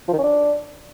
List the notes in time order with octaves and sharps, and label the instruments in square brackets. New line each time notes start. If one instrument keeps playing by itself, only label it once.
[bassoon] F3
D#3
C#4
D4